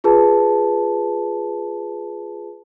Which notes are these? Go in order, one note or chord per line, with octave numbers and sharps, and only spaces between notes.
F4 G#4 B4 A5